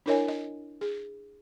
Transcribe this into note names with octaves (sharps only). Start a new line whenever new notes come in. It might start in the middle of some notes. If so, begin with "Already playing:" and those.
D4 E4 A#4 C#5 D#5 G#5
D#5
G#4